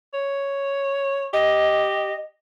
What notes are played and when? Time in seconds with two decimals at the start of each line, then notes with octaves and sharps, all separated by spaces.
0.14 C#5
1.33 G4 D#5